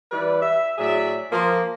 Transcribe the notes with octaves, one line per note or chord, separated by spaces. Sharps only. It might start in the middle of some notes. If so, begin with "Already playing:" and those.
E3 G3 B4 D5
E5
A2 F#3 G#4 D5 E5
F3 A#3 F4